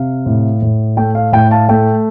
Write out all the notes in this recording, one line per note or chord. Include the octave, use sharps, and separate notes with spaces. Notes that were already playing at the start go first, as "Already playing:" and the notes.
Already playing: C3 F5
A2
A2
A3 G5
F5
A2 G5
F5 A5
A3 G5